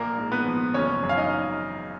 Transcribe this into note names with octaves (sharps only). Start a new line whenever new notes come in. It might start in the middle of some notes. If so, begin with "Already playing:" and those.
Already playing: A#1 A#3 A#4
G#2
B3 B4
F3
F#1 C#4 C#5
F#2
F5
D#4 D#5